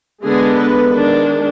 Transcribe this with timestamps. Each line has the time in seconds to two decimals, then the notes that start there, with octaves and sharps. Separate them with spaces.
0.23 D3 G#3 B3 D4 G#4
0.57 B4
0.92 D#3 G#3 D4